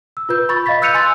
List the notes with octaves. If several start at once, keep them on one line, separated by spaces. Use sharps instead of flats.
E6
F4 B4 G6
B5 C#6 A6
D#5 F5 B5 A6 B6
E6 F#6 G6 C#7 D#7 F7
G#5 C6 E6 A6